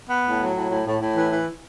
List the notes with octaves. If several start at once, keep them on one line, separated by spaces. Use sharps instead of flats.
B3
A2
F#3
A2
A2
A2
A2
E3
E3